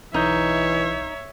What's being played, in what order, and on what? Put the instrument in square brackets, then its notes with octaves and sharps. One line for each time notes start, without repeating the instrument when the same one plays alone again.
[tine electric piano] B1 G6 [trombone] E3 [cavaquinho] D#4 [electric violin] C#5 E5